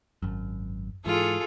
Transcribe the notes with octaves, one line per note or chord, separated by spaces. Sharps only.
G#1 F#2
G#2 E3 F4 G#4 A4